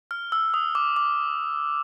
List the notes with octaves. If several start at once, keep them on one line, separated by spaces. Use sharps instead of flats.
F6
E6
D#6
D6
D6